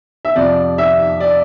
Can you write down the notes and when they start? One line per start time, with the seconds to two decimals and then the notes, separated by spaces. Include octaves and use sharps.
0.25 E5
0.35 F2 C3 F3 D5
0.78 E5
1.20 D5